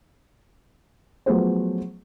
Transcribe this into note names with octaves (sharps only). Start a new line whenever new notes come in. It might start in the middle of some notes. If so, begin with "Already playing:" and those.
F3 F#3 A3 B3 G#4 C5